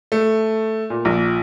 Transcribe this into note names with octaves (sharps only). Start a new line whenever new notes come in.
A3
A#2
A#1